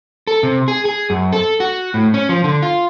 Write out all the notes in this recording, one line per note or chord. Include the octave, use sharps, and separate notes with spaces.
A4
C3
G#4
G#4
F#2
A4
F#4
A2
C#4
F3
D3
F4